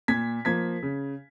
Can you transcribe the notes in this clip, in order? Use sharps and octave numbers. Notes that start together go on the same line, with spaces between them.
A#2 G#6 B6
F3 A#3 G#6 B6
C#3